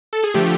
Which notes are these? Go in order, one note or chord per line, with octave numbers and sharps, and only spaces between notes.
A4
G#4
D3 F3 A3 G4